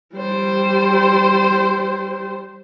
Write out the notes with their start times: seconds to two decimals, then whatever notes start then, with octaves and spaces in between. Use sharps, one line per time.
0.15 G3 C5